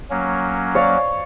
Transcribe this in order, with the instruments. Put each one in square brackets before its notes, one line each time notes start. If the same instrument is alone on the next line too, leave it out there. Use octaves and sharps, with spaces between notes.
[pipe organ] F#3 A#3 C#4
[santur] C#5 D5 F5